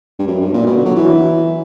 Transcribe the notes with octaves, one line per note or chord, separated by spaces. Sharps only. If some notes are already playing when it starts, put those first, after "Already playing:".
G2
F#2
G2
A#2
B2
D3
F#3
E3